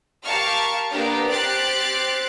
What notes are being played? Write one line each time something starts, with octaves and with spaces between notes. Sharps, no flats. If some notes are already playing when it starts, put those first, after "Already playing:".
G4 A#4 F5 A5 C#6 F6
A#3 B3 D4 G4 A#4
C4 G4 F#6 A6 C7 D7